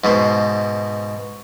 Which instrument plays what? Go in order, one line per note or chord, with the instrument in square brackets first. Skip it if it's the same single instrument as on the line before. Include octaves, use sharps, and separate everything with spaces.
[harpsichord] G#2 B2 C5